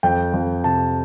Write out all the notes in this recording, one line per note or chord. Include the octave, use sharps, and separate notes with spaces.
F2 G5
F2
C3 A5